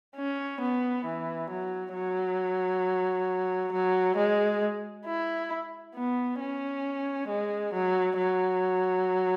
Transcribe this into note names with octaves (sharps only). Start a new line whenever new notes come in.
C#4
B3
E3
F#3
F#3
F#3
G#3
E4
B3
C#4
G#3
F#3
F#3